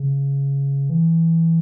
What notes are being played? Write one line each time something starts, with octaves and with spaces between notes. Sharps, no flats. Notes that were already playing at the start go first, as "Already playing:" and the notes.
Already playing: C#3
E3